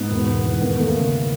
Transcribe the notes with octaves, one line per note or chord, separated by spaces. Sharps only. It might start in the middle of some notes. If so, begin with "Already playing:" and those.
Already playing: G#2 B3
E1
E1
E2
D#2 B3
D#2 A3
A#3
C#3